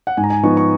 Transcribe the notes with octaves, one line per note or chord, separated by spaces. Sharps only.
F#5
G#2 G#5
A#5
G#5
F3 B3 D#4 C#6
C#6